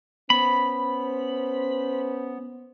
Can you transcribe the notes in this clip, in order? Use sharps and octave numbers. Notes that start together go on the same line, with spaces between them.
B3 C#4 B4 C5 B5